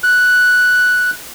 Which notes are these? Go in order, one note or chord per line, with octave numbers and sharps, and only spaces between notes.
F#6